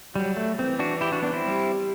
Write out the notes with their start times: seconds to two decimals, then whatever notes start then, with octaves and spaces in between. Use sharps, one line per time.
0.15 F#3 G3
0.37 A3
0.58 E3 C4
0.79 D4 F#4
1.01 E4 G4
1.12 D4 F#4
1.22 B3 D4
1.33 C4 E4
1.44 G3